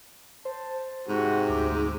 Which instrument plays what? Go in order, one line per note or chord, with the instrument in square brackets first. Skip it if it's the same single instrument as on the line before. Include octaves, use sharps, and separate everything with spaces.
[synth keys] C5 [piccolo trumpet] A5
[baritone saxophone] G#2 [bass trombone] C3 [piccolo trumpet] F#4
[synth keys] D2 [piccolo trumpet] D6